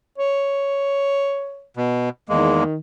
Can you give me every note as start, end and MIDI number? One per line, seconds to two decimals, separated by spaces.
0.18 1.66 73
1.77 2.09 47
2.29 2.64 40
2.29 2.77 51
2.29 2.64 56
2.29 2.64 58